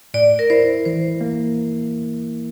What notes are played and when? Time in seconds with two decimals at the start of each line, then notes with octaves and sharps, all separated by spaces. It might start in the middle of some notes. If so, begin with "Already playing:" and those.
0.14 A2 D5
0.39 A#4
0.50 E4 C5
0.85 E3 C5
1.21 A#3